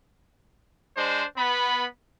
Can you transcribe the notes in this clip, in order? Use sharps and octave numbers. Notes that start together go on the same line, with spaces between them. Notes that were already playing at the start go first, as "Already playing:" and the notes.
G#3 D4 C5
B3 B5